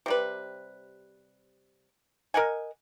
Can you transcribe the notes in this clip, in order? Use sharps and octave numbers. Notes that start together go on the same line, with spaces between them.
C3 G3 B4
A#4 D#5 F#5 G#5